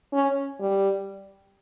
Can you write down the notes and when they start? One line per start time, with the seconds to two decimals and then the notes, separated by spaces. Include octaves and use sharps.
0.13 C#4
0.60 G3